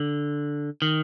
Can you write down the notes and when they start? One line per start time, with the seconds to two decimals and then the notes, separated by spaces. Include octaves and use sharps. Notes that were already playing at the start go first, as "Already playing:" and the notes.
Already playing: D3
0.82 D#3